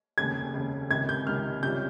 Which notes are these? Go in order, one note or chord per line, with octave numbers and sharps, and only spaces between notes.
F1 D#2 C#3 G#6
F1 D#2 C#3
C#2 C3 D#3 G#6
G6
C#2 C3 D#3 F6
C#2 C3 G3 C#4 F4 G6